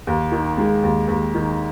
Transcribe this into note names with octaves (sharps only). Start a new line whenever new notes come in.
D#2
D#3
G#3
D#2
D#2
D#3